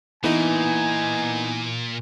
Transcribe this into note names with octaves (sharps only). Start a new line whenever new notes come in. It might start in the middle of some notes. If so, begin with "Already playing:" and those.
A#2 E3 B3 D#4 G#5